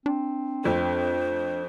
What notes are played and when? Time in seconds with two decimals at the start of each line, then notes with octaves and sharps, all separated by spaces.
0.06 C4 D4
0.64 F2 A3 C5